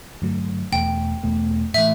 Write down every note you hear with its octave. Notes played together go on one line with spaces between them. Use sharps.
G2 D3 F#3 A3
E2 B2 A3 G5
E2 B2 A3
A2 E3 A3 E5